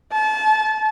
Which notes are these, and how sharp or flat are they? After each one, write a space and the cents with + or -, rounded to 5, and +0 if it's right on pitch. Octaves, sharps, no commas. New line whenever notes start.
A5 -30